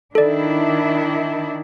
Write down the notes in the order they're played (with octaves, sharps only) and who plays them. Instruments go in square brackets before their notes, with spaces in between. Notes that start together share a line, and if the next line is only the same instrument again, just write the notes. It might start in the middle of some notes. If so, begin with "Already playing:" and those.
[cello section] D#3 D4 E4 [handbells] A4 D5